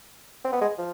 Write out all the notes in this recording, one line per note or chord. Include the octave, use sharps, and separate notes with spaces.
C4
B3
G#3
F3